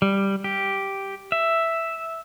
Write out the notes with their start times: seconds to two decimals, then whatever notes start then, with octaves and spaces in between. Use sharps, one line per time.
0.02 G3
0.44 G4
1.32 E5